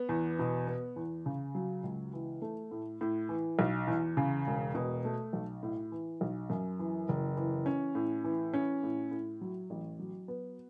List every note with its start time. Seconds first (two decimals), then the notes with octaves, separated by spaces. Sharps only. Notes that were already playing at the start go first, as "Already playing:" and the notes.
Already playing: B3
0.09 E2
0.39 B2
0.67 B3
0.96 E2
1.26 C#3
1.55 F#3
1.83 C#2
2.13 E3
2.42 A3
2.71 A2
3.01 A2
3.29 E3
3.59 B1
3.87 E2
4.17 C#3
4.47 E1
4.75 B2
5.05 A3
5.33 B1
5.63 A2
5.92 E3
6.21 B1
6.50 F#2
6.79 E3
7.09 F#1
7.37 E3
7.66 C#4
7.95 A2
8.24 E3
8.53 C#4
8.83 A2
9.11 A2
9.41 F#3
9.70 A1
9.99 F#3
10.28 B3